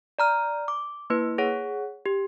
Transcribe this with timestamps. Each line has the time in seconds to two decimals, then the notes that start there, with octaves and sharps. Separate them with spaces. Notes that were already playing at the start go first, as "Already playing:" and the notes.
0.19 D5 A#5 F6
0.68 D6
1.10 A#3 E4 B4
1.38 G#4 C#5 F#5
2.06 G4